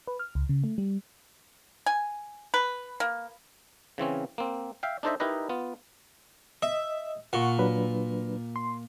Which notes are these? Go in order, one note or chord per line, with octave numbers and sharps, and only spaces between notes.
B4
F6
C#2
C#3
A3
G3
G#5
B4
A#3
C#3 E3 C4 C#4
A#3 C4
E5 F5 G5
D4 D#4 A4 C5 D#5 E5
D#4 E4 G4 A#4 B4 D#5
B3 F4
D#5 E5
A#2 F#5 C#6
F#3 D4 B4
C6